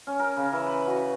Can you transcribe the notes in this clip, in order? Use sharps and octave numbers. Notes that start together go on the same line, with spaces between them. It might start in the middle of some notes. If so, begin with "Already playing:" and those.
C#4
A#4
C#3
E3
B4
F#4
B4